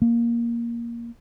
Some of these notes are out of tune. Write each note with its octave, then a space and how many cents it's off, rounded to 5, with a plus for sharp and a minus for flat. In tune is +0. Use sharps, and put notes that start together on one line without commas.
A#3 +10